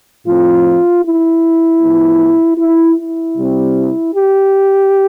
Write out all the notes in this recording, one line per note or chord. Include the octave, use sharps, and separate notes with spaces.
A2 F3 C4 F4
E4
A2 F3 B3
E4
E4
C3 G3 C4
G4